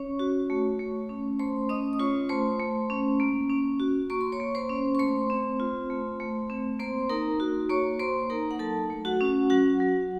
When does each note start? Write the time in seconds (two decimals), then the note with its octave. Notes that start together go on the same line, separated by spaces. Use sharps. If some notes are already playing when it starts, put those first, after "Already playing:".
Already playing: C#4 C#5 C#6
0.19 F#4
0.50 A3
0.79 A3
1.09 C#4
1.39 A3 C5 C6
1.69 C#4 D#5 D#6
1.93 D#6
1.99 F4 C#5 C#6
2.29 A3 C5 C6
2.60 A3
2.90 C#4
3.20 A#3
3.50 C#4
3.79 F#4
4.10 A#3 C#6
4.21 C6
4.32 C#5 C#6
4.40 A#3
4.55 C5 C6
4.70 C#4
4.95 C#6
4.99 A3 C5 C6
5.30 C4
5.60 F4
5.90 A3
6.20 A3
6.50 C4
6.80 A#3 C5 C6
7.10 D#4 A#4 A#5
7.40 F#4
7.69 A#3 C#5 C#6
7.99 A#3 C5 C6
8.30 D#4 A#4 A#5
8.51 F#5
8.59 F#3 A4 A5
8.90 A3
9.05 F#4 F#5
9.20 C#4
9.50 F#3 F#4 F#5
9.80 F#3